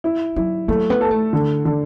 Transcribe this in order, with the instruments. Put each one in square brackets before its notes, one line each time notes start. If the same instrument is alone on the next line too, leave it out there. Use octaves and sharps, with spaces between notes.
[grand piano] E4
[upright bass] F#3 [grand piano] E4
[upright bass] F#3 [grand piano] A3
[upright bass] B3
[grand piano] A4
[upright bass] A3
[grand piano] D3
D3